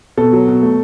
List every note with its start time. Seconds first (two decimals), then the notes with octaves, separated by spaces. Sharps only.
0.17 B2 A4
0.33 F#3
0.48 B2
0.63 A3